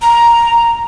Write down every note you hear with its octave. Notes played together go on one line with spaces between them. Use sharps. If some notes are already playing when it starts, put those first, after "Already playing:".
A#5